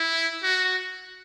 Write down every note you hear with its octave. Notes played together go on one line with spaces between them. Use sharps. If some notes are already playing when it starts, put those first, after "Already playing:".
Already playing: E4
F#4